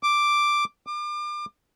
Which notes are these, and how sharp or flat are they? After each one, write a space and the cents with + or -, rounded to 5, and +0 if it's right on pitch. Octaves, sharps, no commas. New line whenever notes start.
D6 +5
D6 +35